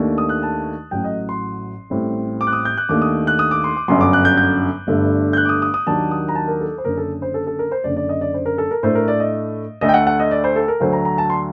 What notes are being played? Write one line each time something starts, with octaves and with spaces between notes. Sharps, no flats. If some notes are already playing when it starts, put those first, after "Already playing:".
Already playing: D#2 D#3 A3 D4
D#6
F#6
A5
A1 A2 F#3 G5
D#5
C6
A1 A2 G3 C4
D6
F#6
D#6
G6
F#6
D#2 D#3 A3 D4 D6
D#6
F#6
D#6
D6
C6
D6
G1 F#2 D3 F#3 C6
D6
F#6
G6
G6
G1 G2 D3 A3
G6
F#6
D6
D#6
D#6
D#6
D#2 D#3 F#3 A#3 D4 A5
D#6
A#5
A5
A#4
A4
C5
F#1 F#2 D3 A#4
A4
C5
A4
A4
A#4
C5
F#1 F#2 D3 D5
D5
D#5
D5
C5
A#4
A4
A#4
A2 A3 D4 C5
A#4
D5
D#5
D2 D3 A3 D#5
G5
F#5
F#5
D#5
D5
C5
A4
A#4
D2 D3 F#3 A3 C5
A#5
A#5
A5
C6